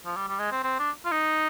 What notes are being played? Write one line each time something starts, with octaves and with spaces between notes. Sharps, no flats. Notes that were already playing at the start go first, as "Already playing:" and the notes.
F3
G3
G3
G#3
C4
C4
D4
F4
D#4